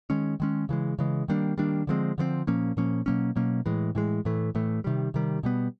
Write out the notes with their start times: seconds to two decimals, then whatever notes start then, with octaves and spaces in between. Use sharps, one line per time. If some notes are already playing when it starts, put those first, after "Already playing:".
0.10 D#3 G#3 C#4
0.40 D#3 G#3 C#4
0.69 C#3 E3 G#3
0.99 C#3 E3 G#3
1.28 D#3 G3 A#3 D4
1.58 D#3 G3 A#3 D4
1.87 D3 F3 G#3 C4
2.18 D3 F3 G#3 C4
2.47 A#2 F3 A#3 C#4
2.77 A#2 F3 A#3 C#4
3.06 B2 F#3 A#3 C#4
3.36 B2 F#3 A#3 C#4
3.66 A2 E3 G#3
3.95 A2 E3 G#3
4.25 A2 E3 A3
4.55 A2 E3 A3
4.84 C3 D#3 G3
5.14 C3 D#3 G3
5.43 B2 G3 B3